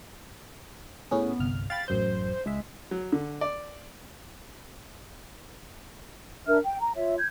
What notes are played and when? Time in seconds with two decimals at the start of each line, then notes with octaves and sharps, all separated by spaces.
1.11 A2 B3 C#4 G#4
1.40 G1 C2 F6
1.70 F5 G5 B5 A6
1.88 A1 F#2 C5 G6
2.46 C#2 G#3 E5
2.91 F#3
3.12 D3
3.41 D5
6.46 D4 A#4 E5 F6
6.63 G5
6.80 A#5
6.95 F4 C#5 E5
7.17 G6 G#6